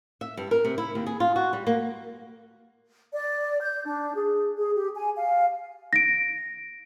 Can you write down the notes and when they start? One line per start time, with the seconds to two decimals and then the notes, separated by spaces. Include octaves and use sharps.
0.21 E5
0.37 G2
0.51 A#4
0.65 C3
0.78 E4
0.95 D#2
1.06 G#4
1.20 F4
1.36 F#4
1.53 G3
1.67 A#3
3.14 D5
3.61 G6
3.86 D4
4.15 G#4
4.57 G#4
4.75 G4
4.96 G#5
5.16 F5
5.93 A#6 D7